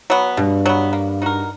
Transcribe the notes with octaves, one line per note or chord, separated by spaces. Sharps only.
F#3 B3
G2 B2
F#3 B3
A#3
D#4 F#4 A#4